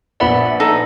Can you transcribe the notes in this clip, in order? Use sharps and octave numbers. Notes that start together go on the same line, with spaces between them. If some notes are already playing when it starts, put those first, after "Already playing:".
A#1 B3 D5 E5 F#5 B5
D#4 A4